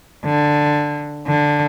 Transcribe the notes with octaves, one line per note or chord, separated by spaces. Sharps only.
D3
D3